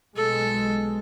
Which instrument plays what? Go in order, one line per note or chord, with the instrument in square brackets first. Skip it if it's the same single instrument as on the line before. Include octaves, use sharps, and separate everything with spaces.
[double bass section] B1 G#3 [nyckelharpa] A4